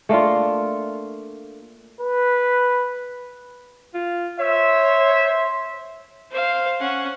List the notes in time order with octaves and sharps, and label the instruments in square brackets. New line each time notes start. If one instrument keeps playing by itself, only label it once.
[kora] A3 A#3 D4 F4
[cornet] B4
[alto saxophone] F4
[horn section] C5 E5 [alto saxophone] C#5
[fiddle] C5 F5
C#4 F#5